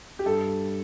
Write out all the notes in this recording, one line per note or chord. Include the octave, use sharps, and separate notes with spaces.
G4
G2 A4